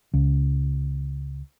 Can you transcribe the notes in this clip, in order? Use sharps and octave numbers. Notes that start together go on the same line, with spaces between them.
C#2